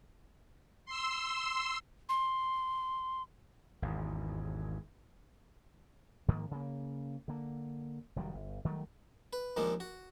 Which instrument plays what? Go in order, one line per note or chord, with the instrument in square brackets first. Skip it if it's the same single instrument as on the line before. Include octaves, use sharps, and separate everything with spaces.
[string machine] C6 E6
[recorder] C6
[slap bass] G#1 E2
G#2 D#3 F3 A#3
C#3 A#3
D3 A#3
F1 D#3 F#3 G3
G1
D#3 F#3 G3 A3
[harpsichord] B4
D#2 D#3 F3 G#3 D4
F#4